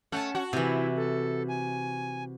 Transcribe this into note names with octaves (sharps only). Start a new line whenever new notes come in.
A3 C#4 F#5 A5
F#4
C3 E3 E4
A4
G#5